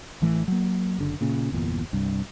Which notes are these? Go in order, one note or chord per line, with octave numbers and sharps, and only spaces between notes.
A1 E3 A3
F#3 A#3
F#1 D3
A#2 C#3
G1 E2 A#2
C2 G2